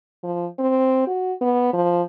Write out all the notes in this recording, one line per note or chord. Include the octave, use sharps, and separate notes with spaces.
F3
C4
F#4
B3
F3